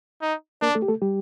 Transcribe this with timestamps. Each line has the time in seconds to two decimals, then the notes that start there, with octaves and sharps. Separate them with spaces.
0.22 D#4
0.62 A#3 D4 A#4
0.75 A3 A4
0.82 G4
0.88 A3 A4
1.02 G3 G4